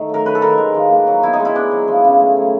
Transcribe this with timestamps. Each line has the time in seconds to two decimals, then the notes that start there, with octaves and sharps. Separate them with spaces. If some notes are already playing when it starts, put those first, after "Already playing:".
Already playing: D#3 A3
0.09 F#3
0.14 A#4
0.26 F#3 B4
0.35 A4
0.41 D#3 A#4
0.58 G#3
0.74 F3
0.90 A#3
1.07 F#3
1.22 B3 E4
1.33 D#4
1.40 G#3
1.45 E4
1.55 B3 D4
1.71 F#3
1.88 F3
2.04 C#3
2.20 A3
2.37 F#3